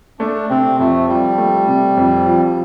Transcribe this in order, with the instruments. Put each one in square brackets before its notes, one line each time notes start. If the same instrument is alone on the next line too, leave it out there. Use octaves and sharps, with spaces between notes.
[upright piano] A3 [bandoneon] D4
[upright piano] C3 [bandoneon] C4
[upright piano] F2 [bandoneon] A3
[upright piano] F3 [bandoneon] G3
[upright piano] A3
C3
F2
F3